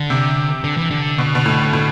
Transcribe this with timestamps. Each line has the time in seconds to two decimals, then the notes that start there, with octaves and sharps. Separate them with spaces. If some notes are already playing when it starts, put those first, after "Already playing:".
Already playing: D3
0.10 C3
0.64 D3
0.77 E3
0.91 D3
1.18 B2
1.35 B2
1.46 A2
1.73 A2